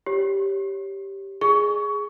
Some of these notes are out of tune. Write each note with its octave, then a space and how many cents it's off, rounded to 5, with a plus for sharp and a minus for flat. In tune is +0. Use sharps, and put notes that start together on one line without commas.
G4 +0 C#5 +0
G#4 +0 C#6 +20